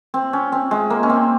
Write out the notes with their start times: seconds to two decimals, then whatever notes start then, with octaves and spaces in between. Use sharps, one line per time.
0.14 C4
0.33 C#4
0.52 C4
0.71 G#3
0.90 A#3
1.03 C#4
1.10 C4